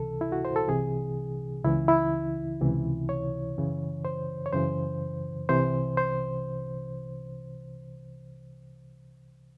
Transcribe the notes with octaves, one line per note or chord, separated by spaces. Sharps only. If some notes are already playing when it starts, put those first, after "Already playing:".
Already playing: C#2 C3 E3 A4
E4
F#4
C5
A4
C2 C3 E3 G#4
C#2 C#3 E3 E4
E4
C#2 C3 E3
C#5
F#2 C#3 E3
C5
C#5
F#2 C#3 E3 C5
C2 C3 E3 C5
C5